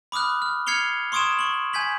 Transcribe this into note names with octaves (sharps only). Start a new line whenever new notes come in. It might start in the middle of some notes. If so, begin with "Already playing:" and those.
B5 D6 D#6 F6 F#6
F6
F6 G#6 C7 C#7 F7 G7
C6 C#6 D#6 G#6 D7 E7
C#6 F#7
G#5 G6 G#6 B6 F#7